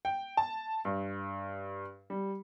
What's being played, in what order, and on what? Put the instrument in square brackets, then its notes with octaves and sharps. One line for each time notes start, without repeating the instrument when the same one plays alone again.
[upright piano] G5
A5
G2
G3